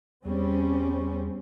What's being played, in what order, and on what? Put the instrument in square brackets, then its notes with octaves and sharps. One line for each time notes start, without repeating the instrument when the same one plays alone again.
[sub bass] E2 [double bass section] G3 C4 C#4